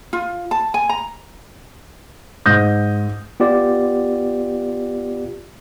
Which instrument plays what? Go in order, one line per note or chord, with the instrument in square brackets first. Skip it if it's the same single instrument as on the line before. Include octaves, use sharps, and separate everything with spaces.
[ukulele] F4
A5
G#5
A#5
[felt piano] G#2 D#6 G6 A#6
[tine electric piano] B3 F4 G4 D5